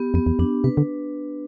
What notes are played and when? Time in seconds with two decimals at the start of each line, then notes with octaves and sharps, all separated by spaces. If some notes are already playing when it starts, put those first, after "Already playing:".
Already playing: B3 G4
0.14 F2 B3
0.26 E2
0.39 F2 D4
0.64 C3 B4
0.77 D3